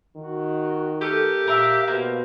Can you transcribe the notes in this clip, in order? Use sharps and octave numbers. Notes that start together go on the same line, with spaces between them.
D#3 F#4
A3 G4 A#4
A#2 A#4 E5 F5
B2 A#3 C5